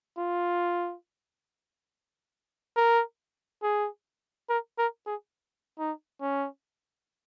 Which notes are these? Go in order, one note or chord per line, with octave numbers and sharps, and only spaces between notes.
F4
A#4
G#4
A#4
A#4
G#4
D#4
C#4